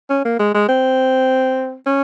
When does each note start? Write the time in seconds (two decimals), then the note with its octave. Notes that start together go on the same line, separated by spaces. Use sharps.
0.10 C#4
0.25 A#3
0.39 G#3
0.54 G#3
0.69 C4
1.87 C#4